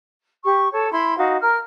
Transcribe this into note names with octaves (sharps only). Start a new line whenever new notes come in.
G4 C#6
A4 C#5
E4 B5 C6
D#4 F#4 F5
A#4 F6